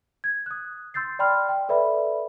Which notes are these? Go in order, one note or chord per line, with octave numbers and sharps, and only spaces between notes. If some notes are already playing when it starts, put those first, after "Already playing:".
G#6
D#6 F#6
C6 E6 G6 A6 C7
D5 G5 B5 C6 F6
G5
A4 B4 D5 E5 B5